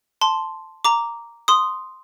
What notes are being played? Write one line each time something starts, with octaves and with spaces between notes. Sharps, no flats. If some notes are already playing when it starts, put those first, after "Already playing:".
A5 C6
A#5 D6
C6 D#6